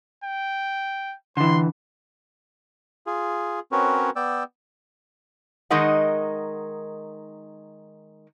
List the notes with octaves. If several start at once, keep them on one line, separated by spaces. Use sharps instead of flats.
G5
D3 E3 C6
F4 G#4
C4 C#4 F#4 A#4 B4 C#5
B3 D5 G5 E6
D#3 G#3 D#4 A#4 D#5 F#5